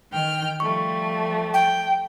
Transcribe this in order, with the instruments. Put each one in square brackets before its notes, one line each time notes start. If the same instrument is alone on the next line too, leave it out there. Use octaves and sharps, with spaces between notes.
[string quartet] D#3 G5 F6
[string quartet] F3 G3 A3 [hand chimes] C#6
[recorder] G5